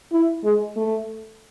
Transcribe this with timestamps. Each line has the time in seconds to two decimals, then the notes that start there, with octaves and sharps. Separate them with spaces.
0.13 E4
0.44 G#3
0.77 A3